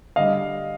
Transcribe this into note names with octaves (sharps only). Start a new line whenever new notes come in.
D3 G3 D#5 F5